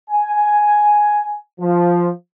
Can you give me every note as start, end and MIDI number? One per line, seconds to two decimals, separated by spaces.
0.10 1.35 80
1.61 2.09 53